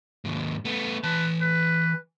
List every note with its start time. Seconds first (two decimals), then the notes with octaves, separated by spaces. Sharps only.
0.25 D#2 G#2
0.65 A3 B3
1.04 E3 B4 A5
1.41 B4